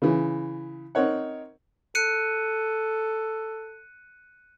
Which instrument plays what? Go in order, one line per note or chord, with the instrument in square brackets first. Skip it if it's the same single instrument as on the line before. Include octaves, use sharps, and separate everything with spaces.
[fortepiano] C#3 E3
C4 D#4 A#4 C#5 F#5
[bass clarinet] A4 [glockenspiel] F#6 C#7 D#7